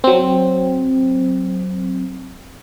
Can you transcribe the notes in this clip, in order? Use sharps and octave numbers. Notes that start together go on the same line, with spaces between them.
F#3 C4